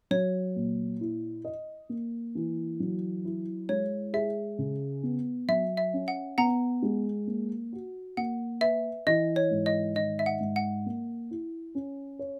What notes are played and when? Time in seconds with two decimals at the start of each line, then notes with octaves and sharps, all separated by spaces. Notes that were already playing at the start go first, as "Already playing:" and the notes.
0.11 F#3 C#5
0.56 A#2
1.01 E4
1.45 D#5
1.89 A#3
2.35 E3
2.80 F#3
3.25 E4
3.69 G#3 C#5
4.13 G#4 E5
4.58 C#3
5.03 B3
5.48 F#3 E5
5.77 E5
5.93 C#4
6.08 F#5
6.38 B3 F#5 A#5
6.82 G#3
7.27 A#3
7.73 F#4
8.17 A#3 F#5
8.61 B4 E5
9.06 E3 D#5
9.36 C#5
9.51 G#2
9.66 D#5
9.95 D#3 D#5
10.19 E5
10.26 F#5
10.40 G#2
10.56 F#5
10.86 A#3
11.31 E4
11.75 C#4
12.19 C#5